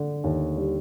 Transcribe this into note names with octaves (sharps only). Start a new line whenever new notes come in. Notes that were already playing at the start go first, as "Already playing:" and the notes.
Already playing: D3
D#2
G3